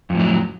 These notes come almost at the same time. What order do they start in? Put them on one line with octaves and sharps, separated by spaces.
F2 A2 F#3